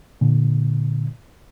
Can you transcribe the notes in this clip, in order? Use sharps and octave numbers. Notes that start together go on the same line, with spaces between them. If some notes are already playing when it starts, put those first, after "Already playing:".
A#2 D3